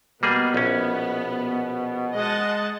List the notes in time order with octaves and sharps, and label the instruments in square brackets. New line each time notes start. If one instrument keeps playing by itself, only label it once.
[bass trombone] B2 [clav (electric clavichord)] G3 A#3 G#4 [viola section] B3
[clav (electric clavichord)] A#1 C#4
[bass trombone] G#3 [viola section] D#5 F#5 A5